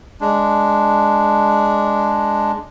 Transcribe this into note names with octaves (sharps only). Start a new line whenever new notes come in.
G#3 D4